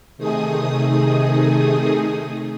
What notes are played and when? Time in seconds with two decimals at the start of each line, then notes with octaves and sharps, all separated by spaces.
0.18 C3 D#3 A3 D#4 G#4 D#6